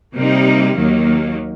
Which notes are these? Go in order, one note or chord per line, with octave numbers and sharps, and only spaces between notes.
C3 G3 A#3 D#4
D#2 D#3 F#3 A#3